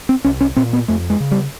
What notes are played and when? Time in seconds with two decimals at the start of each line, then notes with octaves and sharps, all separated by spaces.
0.09 C4
0.24 C2 C#4
0.41 C#4
0.56 A#2 C4
0.73 B3
0.88 F2 A3
1.10 G#3
1.20 C#3
1.31 G3